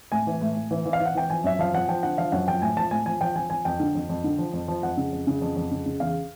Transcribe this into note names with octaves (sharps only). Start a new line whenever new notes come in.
A2 G#5
E3
A2
A2
E3
E3
F5
E3
F#5
E3 G5
F3 G#5
F#2 E5
F3 F5
F3 F#5
F3 G5
D3 F#5
F3 F5
F#2 F#5
F3 G5
A2 G#5
F3 A5
A2 G#5
F3 G#5
F3 G5
F3 G#5
F3 G#5
F2 G5
D3
F2
F2
D3
F3
F2
F3
F2 F#5
C#3
F2
C#3
F2
F2
C#3
C#3
E2 F5